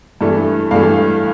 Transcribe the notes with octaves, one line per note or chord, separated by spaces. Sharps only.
G2 E3 A3
G2 E3 A3 F5